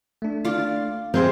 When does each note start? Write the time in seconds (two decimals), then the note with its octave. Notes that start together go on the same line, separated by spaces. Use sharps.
0.22 A3 D4
0.45 F4 D5
1.14 C3 C4 G#4 A#4 C5 F5 C6